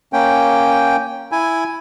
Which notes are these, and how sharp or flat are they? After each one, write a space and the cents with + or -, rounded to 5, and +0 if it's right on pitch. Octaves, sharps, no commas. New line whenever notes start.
A#3 +0 C#4 +0 G5 +0
E4 +0 G#5 +0